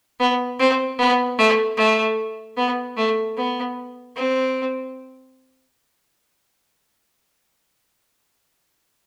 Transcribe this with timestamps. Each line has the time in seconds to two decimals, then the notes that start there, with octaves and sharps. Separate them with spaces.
0.20 B3
0.60 C4
0.99 B3
1.39 A3
1.78 A3
2.57 B3
2.97 A3
3.37 B3
4.16 C4